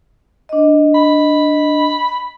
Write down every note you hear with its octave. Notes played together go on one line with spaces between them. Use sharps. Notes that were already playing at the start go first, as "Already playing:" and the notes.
D4 D#5
B5